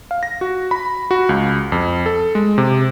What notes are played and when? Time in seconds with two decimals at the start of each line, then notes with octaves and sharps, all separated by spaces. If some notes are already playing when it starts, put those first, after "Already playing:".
0.11 F5
0.23 A#6
0.41 F#4
0.71 B5
1.11 F#4
1.29 C#2
1.72 F2
2.06 A4
2.35 G#3
2.58 C3